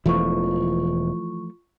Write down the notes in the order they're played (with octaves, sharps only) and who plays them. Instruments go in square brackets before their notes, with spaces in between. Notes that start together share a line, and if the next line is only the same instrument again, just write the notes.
[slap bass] E1 [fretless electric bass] E3 F3 A3 [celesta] F4 C#6